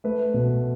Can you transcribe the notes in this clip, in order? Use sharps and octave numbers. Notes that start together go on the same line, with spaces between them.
A3 B4
B2